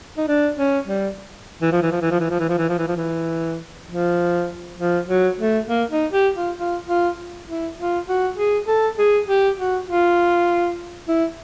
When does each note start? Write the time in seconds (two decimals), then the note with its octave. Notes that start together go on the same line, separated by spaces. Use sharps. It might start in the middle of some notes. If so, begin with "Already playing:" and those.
0.18 D#4
0.28 D4
0.58 C#4
0.87 G3
1.62 E3
1.72 F3
1.82 E3
1.91 F3
2.02 E3
2.11 F3
2.20 E3
2.30 F3
2.40 E3
2.49 F3
2.58 E3
2.69 F3
2.78 E3
2.88 F3
2.97 E3
3.88 F3
4.78 F3
5.08 F#3
5.38 A3
5.68 A#3
5.91 D#4
6.13 G4
6.36 F4
6.57 F4
6.88 F4
7.47 E4
7.78 F4
8.08 F#4
8.37 G#4
8.68 A4
8.98 G#4
9.28 G4
9.58 F#4
9.87 F4
11.08 E4